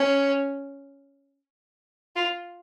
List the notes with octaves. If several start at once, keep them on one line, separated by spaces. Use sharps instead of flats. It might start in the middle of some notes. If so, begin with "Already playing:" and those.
Already playing: C#4
F4